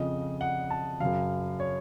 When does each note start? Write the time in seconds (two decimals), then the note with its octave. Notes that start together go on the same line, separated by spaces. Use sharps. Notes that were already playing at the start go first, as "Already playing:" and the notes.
Already playing: F2 C#3 F3 D#5
0.41 F#5
0.70 A5
1.00 F#2 C#3 F#3 F5
1.60 C#5